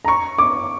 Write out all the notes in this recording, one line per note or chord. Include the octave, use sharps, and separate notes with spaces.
A#5
C#6
D6